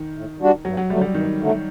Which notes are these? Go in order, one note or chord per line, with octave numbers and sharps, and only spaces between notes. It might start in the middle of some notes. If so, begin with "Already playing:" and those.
Already playing: D#3
A2
G3 D4 F#4
G2 F#3
F#3
D3 F#3 G3 A3
G3
G2 D#3
D3 F#3 A3